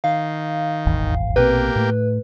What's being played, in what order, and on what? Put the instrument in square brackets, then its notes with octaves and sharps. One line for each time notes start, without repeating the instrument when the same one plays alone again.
[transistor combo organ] D#3 [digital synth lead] F5
[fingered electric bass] D#1 G#1 E2
[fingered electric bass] A#1 B2 C4 [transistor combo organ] A#3 G4 [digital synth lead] B4
[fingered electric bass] A2 A3